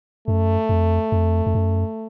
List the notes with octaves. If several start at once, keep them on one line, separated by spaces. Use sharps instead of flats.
F#2 A3
F2
F2
F2
F#2